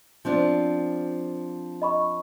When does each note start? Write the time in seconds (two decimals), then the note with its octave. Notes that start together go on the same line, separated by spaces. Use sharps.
0.25 F3 C4 D4
1.82 D#5 B5 C#6